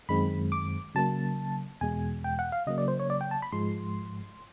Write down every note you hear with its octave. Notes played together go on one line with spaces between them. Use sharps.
F#2 D#3 G#3 C4 B5
D6
C#3 F#3 A#3 A5
E2 B2 G#3 G#5
G5
F#5
F5
C#3 F#3 A#3 D#5
D5
C5
C#5
D5
G5
A5
B5
G#2 F3 G#3 C6